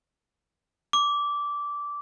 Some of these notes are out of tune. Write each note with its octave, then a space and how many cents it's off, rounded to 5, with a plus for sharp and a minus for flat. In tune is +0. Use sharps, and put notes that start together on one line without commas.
D6 -15